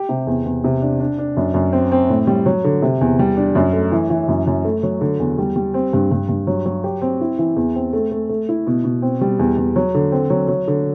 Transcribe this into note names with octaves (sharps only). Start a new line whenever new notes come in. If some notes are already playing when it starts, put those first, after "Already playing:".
Already playing: G4
C3
E2
E2
C3
D4
D4
D4
F#2
F#2
C4
C4
A2
G3
F#3
D3
C3
E2
G3
D4
F#2
A3
E3
E3
F#2
F#2
A3
F#3
D3
E2
G3
G3
C4
G2
G2
G2
F#3
F#3
G4
C4
E4
E3
E2
C4
A3
A3
A3
E4
B2
B2
C4
G3
E2
E2
F#3
D3
C4
F#3
F#3
D3